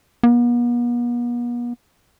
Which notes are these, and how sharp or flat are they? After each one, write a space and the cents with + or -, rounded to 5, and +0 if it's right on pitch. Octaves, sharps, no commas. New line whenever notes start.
B3 -45